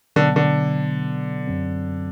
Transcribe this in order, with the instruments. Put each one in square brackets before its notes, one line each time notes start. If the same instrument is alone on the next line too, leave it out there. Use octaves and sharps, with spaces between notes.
[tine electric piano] B2 F#3 B3 [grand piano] D3
[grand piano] D3
[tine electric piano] F#2 F#3 C4